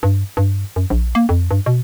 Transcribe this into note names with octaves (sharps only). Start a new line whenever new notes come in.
G2
G2
F#2
A#1
A#3
F2
G2
B2